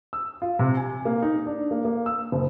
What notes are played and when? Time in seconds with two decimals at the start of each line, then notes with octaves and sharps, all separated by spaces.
0.13 E6
0.42 F4
0.59 C3
0.77 G#5
1.05 A#3
1.22 D#4
1.46 D4
1.71 A#3
1.85 A#3
2.06 E6
2.32 F#1